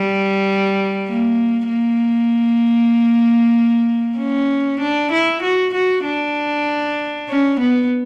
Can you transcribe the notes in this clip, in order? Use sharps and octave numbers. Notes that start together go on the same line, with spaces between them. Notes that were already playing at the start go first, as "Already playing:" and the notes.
Already playing: G3
A#3
A#3
C#4
D4
E4
F#4
F#4
D4
C#4
B3